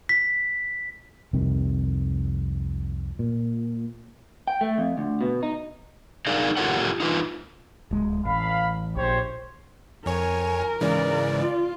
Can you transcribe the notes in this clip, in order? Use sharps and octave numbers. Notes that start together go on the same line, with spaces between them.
B6
C2 F2 C3 D#3
A#2
G5
A3
F2
D2
B2
D#4
D#4 G#4 A#4 D5 F5
F4 G4 A4 A#4 C#5 F#5
D#4 F4 B4
D1 G#3
A1 F5 B5
A#1 G4 C5 C#5
F2 A#4 C#5 G#5
G#2 C#3 E3 D5
F4